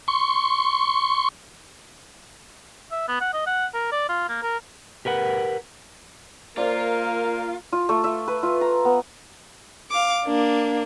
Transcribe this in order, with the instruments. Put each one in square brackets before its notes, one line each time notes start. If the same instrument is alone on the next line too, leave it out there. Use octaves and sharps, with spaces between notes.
[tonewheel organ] C6 C#6
[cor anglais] E5
B3
F#5
D#5
F#5
A#4
D5
F4
A#3
A#4
[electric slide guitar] G4 A#4 B4 F#5
[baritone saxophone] A#3 [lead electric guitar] F4 [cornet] A#4 [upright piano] C5 D5
[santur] F4
A3
E5
B4
F4
A#5
B3
[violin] F5 D6
A#3 D4